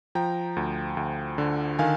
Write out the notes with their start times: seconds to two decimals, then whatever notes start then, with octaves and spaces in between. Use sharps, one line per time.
0.15 F3 G5 A#5
0.57 D2
0.97 D2
1.38 D3
1.79 D#3 F5 G#5